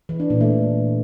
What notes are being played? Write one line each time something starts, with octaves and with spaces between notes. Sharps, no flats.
E3
D4
A#2
A3